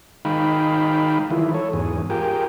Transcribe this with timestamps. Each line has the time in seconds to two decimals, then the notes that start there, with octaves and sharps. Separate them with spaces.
0.25 D#3 G#3 D#4 F5 G5 B5
1.30 D#3 E3 G#3 E4 F4
1.54 A4 C#5
1.73 E2 G#2 G#4
2.10 F4 G4 G#4 A#4 G5